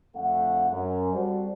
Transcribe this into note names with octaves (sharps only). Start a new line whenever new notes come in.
F2 D3 A3 F5 F#5
F#2
G3 C4 F#4 A4 C5 D5